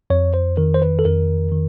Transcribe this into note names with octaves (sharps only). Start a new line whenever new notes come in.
F2 C#5
C5
D#3 A#4
C5
B4
A4
F2 A#4
D#3